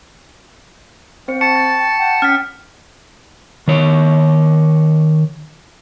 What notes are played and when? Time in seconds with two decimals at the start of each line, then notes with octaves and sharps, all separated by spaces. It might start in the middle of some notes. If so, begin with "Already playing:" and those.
1.28 C4 C5 G5 C#7
1.41 A5 C#6 C#7
1.56 A6
1.98 F#5 G5
2.22 C#4 F6 B6
3.68 D#3 C#5